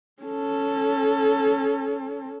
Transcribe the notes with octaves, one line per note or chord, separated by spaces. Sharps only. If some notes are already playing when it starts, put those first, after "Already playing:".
C#4 A4